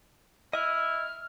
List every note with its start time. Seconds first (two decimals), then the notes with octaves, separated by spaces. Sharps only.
0.53 E4 D#5 E5 F6